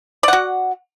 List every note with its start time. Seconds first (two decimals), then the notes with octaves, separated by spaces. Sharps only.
0.23 D5
0.28 F#5
0.33 F#4